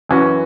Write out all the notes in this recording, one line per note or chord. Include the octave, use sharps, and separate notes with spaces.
F#2 E3 C#4 F#4